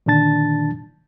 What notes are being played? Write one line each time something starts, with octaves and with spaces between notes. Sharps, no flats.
A#2 D3 D#3 D4 A5 A6